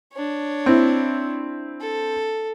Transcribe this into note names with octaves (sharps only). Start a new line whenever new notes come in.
D4 C#5
C4 E4
A4